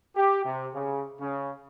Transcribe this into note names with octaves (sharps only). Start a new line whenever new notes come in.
G4
C3
C#3
C#3